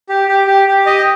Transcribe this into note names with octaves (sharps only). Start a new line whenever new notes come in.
G4
G4
G4
G4
D#5